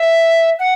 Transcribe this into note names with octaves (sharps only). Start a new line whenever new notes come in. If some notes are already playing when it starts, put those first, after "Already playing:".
Already playing: E5
F#5